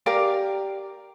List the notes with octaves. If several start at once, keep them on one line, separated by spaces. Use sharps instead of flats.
G4 A#4 D5 F5